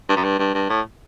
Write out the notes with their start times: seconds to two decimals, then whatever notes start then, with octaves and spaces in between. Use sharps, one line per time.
0.09 G2
0.16 F#2
0.24 G2
0.39 G2
0.54 G2
0.69 A2